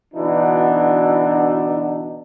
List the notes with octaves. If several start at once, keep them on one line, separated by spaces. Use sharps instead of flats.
B2 D3 E3 D4 D#4 F#4